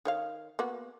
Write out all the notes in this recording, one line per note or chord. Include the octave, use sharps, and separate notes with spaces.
D#3 C#5 F5
A#3 B3 F#4